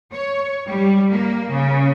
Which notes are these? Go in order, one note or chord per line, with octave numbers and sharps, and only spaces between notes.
C#5
G3
A#3
C#3